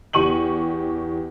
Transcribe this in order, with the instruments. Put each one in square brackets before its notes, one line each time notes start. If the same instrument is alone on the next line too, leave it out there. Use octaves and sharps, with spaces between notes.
[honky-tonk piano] E2 G4 C#6 D#7 F#7